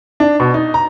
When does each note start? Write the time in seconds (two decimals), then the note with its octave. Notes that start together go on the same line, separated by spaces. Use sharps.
0.20 D4
0.40 B2
0.54 D#4
0.74 A#5